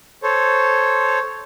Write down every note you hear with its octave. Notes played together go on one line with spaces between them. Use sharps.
A4 C5 C#5